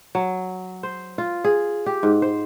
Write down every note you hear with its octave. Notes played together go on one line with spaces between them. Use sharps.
F#3
C5
F4
G#4
G4
G#2
C5